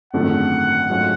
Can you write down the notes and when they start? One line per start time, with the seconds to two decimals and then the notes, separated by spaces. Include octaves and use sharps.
0.13 G#1 F#2 D3 F3 A3 F#5
0.89 G#2 F#3 A3 C#4 F4